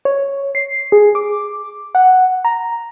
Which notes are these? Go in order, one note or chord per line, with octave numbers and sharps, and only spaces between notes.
C#5
C7
G#4
D6
F#5
A#5